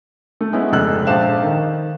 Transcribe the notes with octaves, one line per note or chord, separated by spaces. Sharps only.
A3
G#3 B3 C#4 E4
F1 C#2 G#3 E6 F#6
A#1 A4 C5 F5 E7
D#3